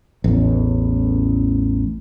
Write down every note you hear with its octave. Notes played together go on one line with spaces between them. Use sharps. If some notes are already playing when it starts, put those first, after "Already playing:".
A1 E2